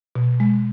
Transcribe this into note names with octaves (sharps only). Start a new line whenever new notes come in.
B2
G#3